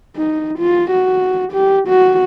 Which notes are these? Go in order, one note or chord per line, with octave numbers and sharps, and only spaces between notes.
D#4
F4
F#4
G4
F#4